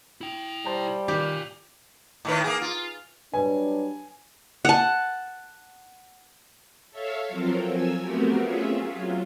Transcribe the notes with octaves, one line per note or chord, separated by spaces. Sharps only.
E4 G5
G3 C5 A5 A#5
D#3 F4 G4 D5
A2 D#3 B4
A#3 G#4
F4
F#3 G3 D4 B4 G#5
F#5 A5
A4 C#5 E5 F5
F3 F#3 C4 F4 A4 A#4
G#5 E6
A3 B3 C4 F#4 G4 A#4
C#4 F4 G#4 E5
F#3 F4